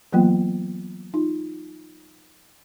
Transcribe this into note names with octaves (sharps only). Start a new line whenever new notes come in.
E3 F#3 A#3 B3 F4 G5
D#4 F4